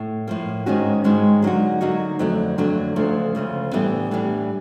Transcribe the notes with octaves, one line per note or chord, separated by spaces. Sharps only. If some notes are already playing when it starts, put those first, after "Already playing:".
Already playing: A2
A2 F3 A#3
G#2 D#3 G#3 C#4 F#4
G#2 D#3 G#3 C#4 F#4
D3 F#3 A#3 D#4 F#4
D3 F#3 A#3 D#4 F#4
F2 D3 F#3 A3 D4
F2 D3 F#3 A3 D4
D2 C#3 F3 A3
D2 C#3 F3 A3
A2 E3 G3 B3 D4
A2 E3 G3 B3 D4